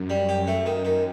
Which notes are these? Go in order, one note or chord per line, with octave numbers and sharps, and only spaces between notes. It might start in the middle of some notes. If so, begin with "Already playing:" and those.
Already playing: F#2
G3
G4
A3
D#3
D#3